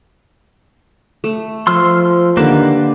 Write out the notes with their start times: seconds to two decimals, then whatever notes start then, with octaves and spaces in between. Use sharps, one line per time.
1.24 A3
1.67 F3 C6 E6 F6
2.37 D3 D#3 A#3 G4 B4 A5